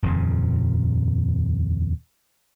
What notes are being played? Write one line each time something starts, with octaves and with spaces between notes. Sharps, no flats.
D#1 F2 A#2 C#3